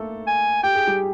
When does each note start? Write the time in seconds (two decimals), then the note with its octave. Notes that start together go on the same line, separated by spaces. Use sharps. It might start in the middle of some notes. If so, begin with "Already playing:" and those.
Already playing: A3 A#3 A4
0.27 G#5
0.63 G4 G5
0.75 G#4
0.87 G3 G4